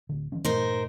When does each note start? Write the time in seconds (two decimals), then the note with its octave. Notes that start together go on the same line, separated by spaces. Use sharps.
0.09 D1 D3
0.32 D#3 F3 C#4
0.45 G2 A#2 A3 D#4 A#4 C5